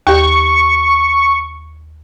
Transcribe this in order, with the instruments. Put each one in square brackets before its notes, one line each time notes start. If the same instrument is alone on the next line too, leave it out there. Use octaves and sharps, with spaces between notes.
[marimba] D#2 G4 [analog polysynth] C#6